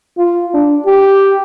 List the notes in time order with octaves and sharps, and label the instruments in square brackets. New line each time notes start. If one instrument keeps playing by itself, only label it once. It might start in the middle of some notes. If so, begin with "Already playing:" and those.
[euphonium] F4
D4
G4